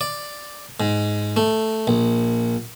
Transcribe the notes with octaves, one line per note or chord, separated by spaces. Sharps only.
D5
G#2
A3
A#1